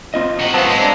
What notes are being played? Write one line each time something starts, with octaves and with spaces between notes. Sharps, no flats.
C4 F4 D#5
C3 F#4
G#2 F#3 B3 C4 F5 A5
G#3
D4 A#5